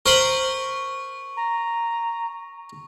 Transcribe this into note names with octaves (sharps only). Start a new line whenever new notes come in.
A#4 C5 B5 C#6
A#5